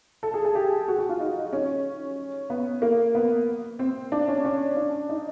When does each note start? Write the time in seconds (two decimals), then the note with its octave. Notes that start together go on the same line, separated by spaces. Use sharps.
0.23 A4
0.34 G#4
0.45 G#4
0.55 G4
0.88 F#4
0.98 F#4
1.09 F4
1.20 D#4
1.53 C#4
2.50 B3
2.82 A#3
3.15 B3
3.79 C4
4.12 D4
4.28 C#4
4.45 C#4
4.77 D4
5.09 D#4